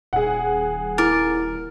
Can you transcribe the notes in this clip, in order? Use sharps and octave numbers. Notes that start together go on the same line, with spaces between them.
D#1 G#4 F#5
E4 A#4 D6 A6